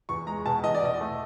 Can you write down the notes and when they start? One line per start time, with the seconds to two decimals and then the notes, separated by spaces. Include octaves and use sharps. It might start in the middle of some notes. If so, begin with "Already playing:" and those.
0.09 E2 C#6
0.27 G#3 A#5
0.46 B2 A5
0.64 E2 D#5
0.75 D5
0.83 B2 D#5
1.01 A3